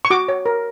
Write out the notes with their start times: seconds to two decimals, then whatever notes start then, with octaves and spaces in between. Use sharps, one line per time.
0.05 C#6
0.10 F#4 D6
0.28 C#5
0.46 A#4